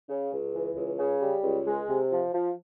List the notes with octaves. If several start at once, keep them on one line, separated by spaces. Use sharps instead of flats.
C#3
C#2
E3
C#2
C#3
G3
C#2
G#3
C3
F3
F3